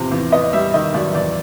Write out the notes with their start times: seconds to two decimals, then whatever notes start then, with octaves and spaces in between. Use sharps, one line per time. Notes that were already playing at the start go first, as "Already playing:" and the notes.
Already playing: E2 C3 F3
0.12 E2
0.32 B3 D#5
0.53 G3 E5
0.74 D#3 D#5
0.94 F#2 D5
1.15 E2 D5